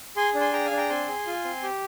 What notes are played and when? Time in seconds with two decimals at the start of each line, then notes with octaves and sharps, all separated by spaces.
0.16 G#4 G#5 C6
0.34 D4
0.41 G#5 C6
0.53 G#4 G5 A#5
0.65 F5 G#5
0.71 D4
0.77 G5 A#5
0.90 C4 G#5 C6
1.08 G#4
1.26 F4
1.44 C4
1.63 G4